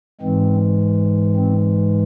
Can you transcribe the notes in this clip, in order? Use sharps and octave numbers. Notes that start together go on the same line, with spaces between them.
G#2 E3 G#3 C4
C4